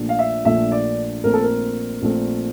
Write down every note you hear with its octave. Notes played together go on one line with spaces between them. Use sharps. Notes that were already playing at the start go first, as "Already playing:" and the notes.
Already playing: A#1 A#2 F3 A3 D4
F5
E5
A#1 A#2 F3 A3 D4 E5
D5
A#1 A#2 A3 C4 A#4
A4
A#4
A#1 A#2 A3 C4